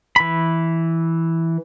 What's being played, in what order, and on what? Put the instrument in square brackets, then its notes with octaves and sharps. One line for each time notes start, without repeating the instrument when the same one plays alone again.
[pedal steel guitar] E3 B5